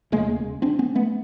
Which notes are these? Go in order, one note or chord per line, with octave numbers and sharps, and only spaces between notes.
E1 D#2 C#3 G#3 A#3
C4 D4
B3 C#4
A3 B3